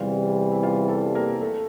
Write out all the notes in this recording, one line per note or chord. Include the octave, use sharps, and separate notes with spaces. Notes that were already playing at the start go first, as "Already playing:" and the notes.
Already playing: E2 C3 E3 G3 F4 F5
E5
F4 F5
A4 A5
A#3 A#4
A3 A4